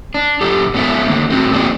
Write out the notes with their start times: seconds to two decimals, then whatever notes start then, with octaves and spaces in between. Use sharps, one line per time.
0.14 D4
0.41 F#2 G4 A4
0.74 F#3 G#3 B3 A4 C#5 E5
1.08 D3 D#3 A#3
1.30 A3 C4 F#4
1.53 F3 A#3 C4 F#4 G#4 D5